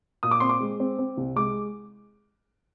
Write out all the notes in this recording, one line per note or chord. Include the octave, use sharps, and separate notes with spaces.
A#2 D#6
D6
C4 C6
D6
G#3
C4
C4
C2
G#3 D6